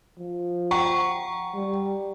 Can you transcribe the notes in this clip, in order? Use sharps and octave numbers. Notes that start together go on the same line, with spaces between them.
F3
F#5 G5 A#5 C#6
G3